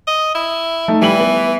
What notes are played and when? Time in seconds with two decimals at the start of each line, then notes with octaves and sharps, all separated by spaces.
0.07 D#5
0.35 E4
0.88 A3 D#4
1.02 E3 G3 F#7
1.19 B3